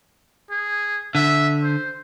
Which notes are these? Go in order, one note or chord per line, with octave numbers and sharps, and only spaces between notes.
G#4
D3 E5
C5